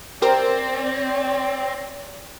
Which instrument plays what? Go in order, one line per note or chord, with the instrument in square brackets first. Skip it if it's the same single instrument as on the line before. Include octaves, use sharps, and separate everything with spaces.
[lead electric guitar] C4 [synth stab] G4 A#4 C5 [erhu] D5